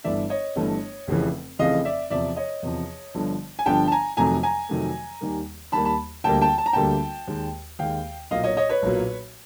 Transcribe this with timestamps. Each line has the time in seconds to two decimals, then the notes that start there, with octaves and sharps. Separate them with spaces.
0.04 G1 G2 E3 A3 D5 E5
0.30 C#5 D#5
0.56 G1 G2 E3 A3
1.08 F1 F2 C#3 E3
1.59 F1 F2 C#3 E3 D#5 F5
1.85 D5 E5
2.10 E2 C3 F3 D5 E5
2.36 C#5 D#5
2.63 E2 C3 F3
3.14 G1 G2 D3 F3
3.59 G#5
3.66 G1 G2 D3 F3 G5 A5
3.87 A5
3.92 G#5 A#5
4.17 F2 C3 D#3 F#3 A3 G#5 A#5
4.43 G#5 A#5
4.69 F2 C3 D#3 F#3 A3
5.21 D#2 D#3 G3 A#3
5.72 D#2 D#3 G3 A#3 A5 B5
5.85 A5 B5
6.24 D2 D3 G3 A#3 G5 A5
6.41 G5 A5
6.58 A5
6.66 A#5
6.73 D2 D3 G3 A#3 G5 A5
7.27 D#2 D#3 G#3
7.79 D#2 D#3 G#3 F5 G5
8.31 B1 A#2 F#3 A#3 D#5 F5
8.44 C#5 D#5
8.57 C#5 D#5
8.69 B4 C#5
8.82 B1 A#2 F#3 A#3